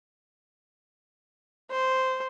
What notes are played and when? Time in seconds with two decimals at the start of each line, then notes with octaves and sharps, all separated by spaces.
1.71 C5